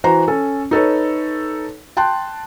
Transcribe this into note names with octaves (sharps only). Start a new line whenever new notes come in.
E3 F#4 C5 A#5
C#4 A4
D#4 A4 B4 C#5
G5 A5 C6 F#6